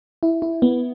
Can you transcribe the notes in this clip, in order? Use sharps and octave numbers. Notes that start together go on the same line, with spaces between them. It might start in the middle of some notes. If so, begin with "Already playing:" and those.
E4
E4
B3